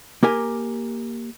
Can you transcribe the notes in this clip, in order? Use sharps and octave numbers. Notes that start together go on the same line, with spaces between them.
A#3 G4 A#4 G#5